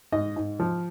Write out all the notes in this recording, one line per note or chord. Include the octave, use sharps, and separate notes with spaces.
G#2 D#5
G#2
F3